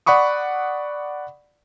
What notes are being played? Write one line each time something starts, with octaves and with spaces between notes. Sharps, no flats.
D5 F#5 B5 C#6 D#6